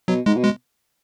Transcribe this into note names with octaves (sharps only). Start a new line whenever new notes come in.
B2 F#3
G#2 G#3
B2
G#3